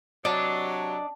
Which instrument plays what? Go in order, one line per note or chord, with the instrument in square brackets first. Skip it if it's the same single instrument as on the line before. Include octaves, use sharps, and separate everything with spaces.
[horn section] C3 F#3 [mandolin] D4 [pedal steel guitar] D5 D#5 A5